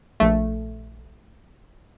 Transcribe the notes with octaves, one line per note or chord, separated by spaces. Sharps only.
A#1 A3